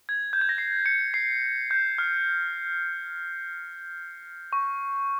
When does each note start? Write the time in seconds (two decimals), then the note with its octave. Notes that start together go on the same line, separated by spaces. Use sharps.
0.09 G#6
0.33 G6
0.41 G#6
0.49 A#6
0.58 C7
0.86 C#7
1.14 C7
1.71 G6
1.98 F6
4.53 C#6